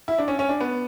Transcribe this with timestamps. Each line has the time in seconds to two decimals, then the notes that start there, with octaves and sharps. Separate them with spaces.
0.08 E4
0.18 D4
0.28 C#4
0.39 C#4
0.49 D4
0.61 B3